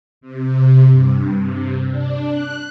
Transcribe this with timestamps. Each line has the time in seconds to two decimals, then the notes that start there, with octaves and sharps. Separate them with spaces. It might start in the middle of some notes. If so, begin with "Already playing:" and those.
0.21 C3
0.88 G2
1.39 C3
1.90 D4
2.30 F#6